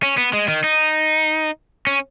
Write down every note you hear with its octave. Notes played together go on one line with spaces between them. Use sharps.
C#4
B3
G#3
D#3
D#4
C#4